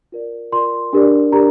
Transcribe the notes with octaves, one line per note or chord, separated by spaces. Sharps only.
F4 A#4 D5
F4 A#4 D5 C6
D4 G4 A#4 D5
D4 G4 A#4 D5 A#5